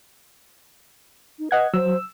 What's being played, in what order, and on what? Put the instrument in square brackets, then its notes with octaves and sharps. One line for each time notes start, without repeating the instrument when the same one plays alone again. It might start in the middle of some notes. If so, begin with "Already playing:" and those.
[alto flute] D#4
[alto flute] B4 [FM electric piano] D#5 F#5 G#6
[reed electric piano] F#3 [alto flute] C5 [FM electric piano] E6